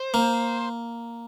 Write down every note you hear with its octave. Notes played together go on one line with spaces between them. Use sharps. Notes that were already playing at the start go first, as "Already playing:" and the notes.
Already playing: C5
A#3